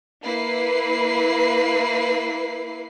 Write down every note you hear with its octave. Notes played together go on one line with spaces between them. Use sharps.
A#3 E4 B4 C7